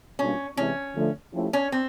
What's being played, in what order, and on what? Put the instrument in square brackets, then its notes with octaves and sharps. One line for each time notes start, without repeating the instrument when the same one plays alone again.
[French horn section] B2 G3 A#3 D4 F4 [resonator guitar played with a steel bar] C#4
[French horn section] C3 E3 G#3 C4 E4 [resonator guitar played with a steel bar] C#4
[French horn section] D3 F3 A3
F3 A3 C#4 E4 G4
[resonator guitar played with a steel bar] C#4
C4